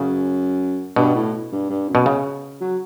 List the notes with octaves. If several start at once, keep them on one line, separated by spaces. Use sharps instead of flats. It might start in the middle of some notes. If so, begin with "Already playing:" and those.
Already playing: F#2 C#3
G2 B2
A2
G2
G2
F#2
B2
C#3
F#3